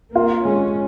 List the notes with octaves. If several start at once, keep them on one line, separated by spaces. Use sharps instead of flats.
A#3 F4
G#3 C#4